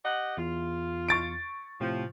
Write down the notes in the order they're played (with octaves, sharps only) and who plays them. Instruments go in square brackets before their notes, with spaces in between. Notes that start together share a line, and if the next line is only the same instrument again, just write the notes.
[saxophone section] G4 D#5 F#5
[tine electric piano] E2 [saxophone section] F4
[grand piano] C#6 A6 D7
[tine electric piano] A2 C3 G5 [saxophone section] F3